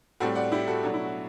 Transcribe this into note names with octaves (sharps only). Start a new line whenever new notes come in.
A2 G3 C4 F#4 A4
D5 F#5
E4 G4
F#4 A4
B2 F#3 A3 D4
E4
F#4